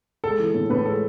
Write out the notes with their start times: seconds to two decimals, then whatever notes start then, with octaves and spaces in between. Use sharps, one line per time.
0.24 G#3 A4
0.39 E3
0.55 A2
0.70 A2 B4
0.86 G#3 A4